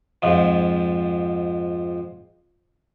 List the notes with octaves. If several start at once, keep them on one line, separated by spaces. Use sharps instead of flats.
F2 G#2 F3